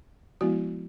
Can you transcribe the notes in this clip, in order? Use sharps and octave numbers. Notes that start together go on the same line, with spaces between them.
F3 G#3 B3 E4 F#4